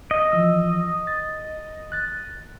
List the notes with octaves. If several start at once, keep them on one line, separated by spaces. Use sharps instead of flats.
D#5
E3 F3 E6
A6
F#6 A6